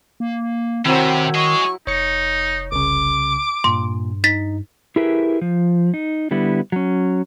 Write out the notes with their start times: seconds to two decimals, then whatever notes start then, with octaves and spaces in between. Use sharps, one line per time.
0.20 A#3
0.85 C3 D#3 F#3 C4 E4
1.35 G#4 D#5 C#6
1.87 F1 D#4 C#5 C#7
2.72 C2 C#3 D6
3.64 G2 A#2 C6
4.24 D#4 A6 B6
4.96 E4 G4 G#4 A#4 B4 E5
5.41 F3
5.94 D#4
6.31 D3 G3 B3 E4
6.72 F#3 C#4